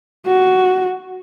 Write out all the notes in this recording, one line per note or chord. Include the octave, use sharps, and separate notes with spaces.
F#4